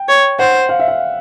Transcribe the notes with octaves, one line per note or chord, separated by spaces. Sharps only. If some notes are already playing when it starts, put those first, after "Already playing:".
Already playing: G5
C#5
C5 F#5
F5
E5
F5